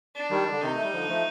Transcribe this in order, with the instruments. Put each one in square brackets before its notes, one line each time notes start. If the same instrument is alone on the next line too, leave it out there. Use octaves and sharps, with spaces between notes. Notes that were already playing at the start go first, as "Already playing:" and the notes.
[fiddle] D4
[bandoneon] D#3 G3
D3
[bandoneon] C3 D#3 [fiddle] D#4
[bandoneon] A3
G3
D3 F3
F3 A3